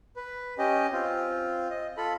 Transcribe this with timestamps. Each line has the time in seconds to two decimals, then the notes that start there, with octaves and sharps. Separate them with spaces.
0.16 B4
0.58 C#4 G4 D#5
0.93 C4 F4
1.70 D#5
1.97 F4 A4 B5